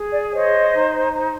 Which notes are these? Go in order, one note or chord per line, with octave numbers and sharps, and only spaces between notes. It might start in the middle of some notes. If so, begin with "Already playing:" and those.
Already playing: G#4
D5
C5 C#5 D#5
D#4
C5